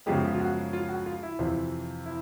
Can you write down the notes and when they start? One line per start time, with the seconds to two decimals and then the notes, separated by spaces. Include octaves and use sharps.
0.06 F#2 C#3 F3 G#3 B3 G4
0.34 F4
0.40 F#4
0.73 F4
0.89 F#4
1.06 F4
1.23 E4
1.39 F2 C3 E3
2.06 E4